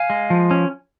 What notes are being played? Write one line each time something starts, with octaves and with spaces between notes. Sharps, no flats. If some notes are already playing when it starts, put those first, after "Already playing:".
Already playing: F5 G#5
G#3
F3
C#4